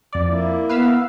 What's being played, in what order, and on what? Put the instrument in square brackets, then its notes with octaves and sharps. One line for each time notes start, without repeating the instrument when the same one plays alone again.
[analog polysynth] F2 D5
[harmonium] A#3 E4
[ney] B3 [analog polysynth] B4 F5 E6